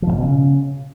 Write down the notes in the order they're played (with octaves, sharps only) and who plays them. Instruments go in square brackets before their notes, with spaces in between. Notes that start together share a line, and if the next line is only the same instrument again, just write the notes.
[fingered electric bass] F3
G#2
A#2
B2
C#3